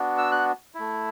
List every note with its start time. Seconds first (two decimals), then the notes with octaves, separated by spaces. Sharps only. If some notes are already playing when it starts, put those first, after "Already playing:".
Already playing: B3 D4 F#4
0.18 E6
0.32 F#6
0.75 A3 E4